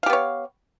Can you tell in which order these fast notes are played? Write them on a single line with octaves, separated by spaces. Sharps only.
F5 G4 B3 C#5